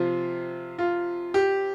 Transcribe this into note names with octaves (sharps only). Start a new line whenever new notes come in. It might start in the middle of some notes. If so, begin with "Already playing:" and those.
Already playing: C3 F3 F4
F4
G4